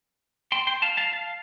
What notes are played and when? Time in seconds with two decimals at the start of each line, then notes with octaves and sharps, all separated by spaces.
0.52 G5 C6
0.67 G5 C6
0.82 F5 A5
0.97 F5 A5
1.13 F5 A5